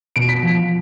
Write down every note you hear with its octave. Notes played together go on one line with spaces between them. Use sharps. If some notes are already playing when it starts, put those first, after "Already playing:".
B2 D7
B6
F3